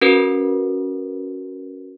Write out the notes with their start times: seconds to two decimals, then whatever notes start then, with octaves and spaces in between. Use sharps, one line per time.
0.01 C#4 F#4 A#4 B4